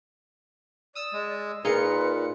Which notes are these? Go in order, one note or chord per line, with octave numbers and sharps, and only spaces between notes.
D5 D#6 E6
G#3
A#2 D#4 F4 G#4 A#4 B4 C#7